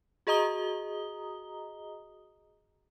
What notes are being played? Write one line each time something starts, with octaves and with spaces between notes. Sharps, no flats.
F#4 G#4 D#5 A#5 D#6 G7